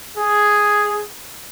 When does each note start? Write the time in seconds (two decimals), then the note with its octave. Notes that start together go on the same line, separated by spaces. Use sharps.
0.17 G#4